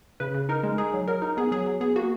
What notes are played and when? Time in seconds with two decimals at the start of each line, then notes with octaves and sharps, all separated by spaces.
0.20 C#3 B4
0.35 C#3
0.49 D#4 A#4
0.63 G#3
0.78 D#4 G#4
0.94 F#3
1.08 F#3 A#4
1.22 D#4
1.37 B3 G#4
1.52 F#3 G#4
1.66 F#3
1.81 B3 G#4
1.96 A#3 F#4